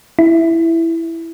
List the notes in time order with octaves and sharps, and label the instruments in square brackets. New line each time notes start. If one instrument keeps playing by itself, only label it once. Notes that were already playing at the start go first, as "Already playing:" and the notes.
[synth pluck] E4